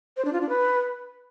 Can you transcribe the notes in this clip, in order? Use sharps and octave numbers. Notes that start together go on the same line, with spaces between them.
C5
D4
F4
D4
B4